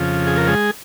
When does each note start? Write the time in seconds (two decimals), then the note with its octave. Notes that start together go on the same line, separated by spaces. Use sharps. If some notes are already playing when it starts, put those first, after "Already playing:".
Already playing: F2 C#3 F3
0.27 G#4
0.37 A#4
0.48 G#3 G#4